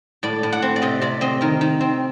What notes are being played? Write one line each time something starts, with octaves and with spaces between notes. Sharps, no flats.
A2 D5
A2
F#5
C4
D5
C3 D#5
C3 D5
C4 D#5
D#3 A#4
D#3
C4